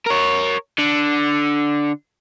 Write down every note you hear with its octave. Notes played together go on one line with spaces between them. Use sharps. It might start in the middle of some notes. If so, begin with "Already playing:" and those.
A#4 C#5
D3